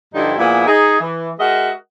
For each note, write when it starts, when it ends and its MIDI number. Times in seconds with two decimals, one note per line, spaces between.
0.15 0.35 43
0.15 0.35 50
0.15 0.35 53
0.15 0.35 55
0.15 0.35 63
0.15 0.35 64
0.38 0.67 46
0.38 0.67 53
0.38 0.67 58
0.38 0.67 59
0.38 0.67 64
0.38 0.67 68
0.67 0.97 63
0.67 0.97 68
1.00 1.31 52
1.40 1.70 56
1.40 1.70 66
1.40 1.70 70
1.40 1.70 75
1.40 1.70 76
1.40 1.70 78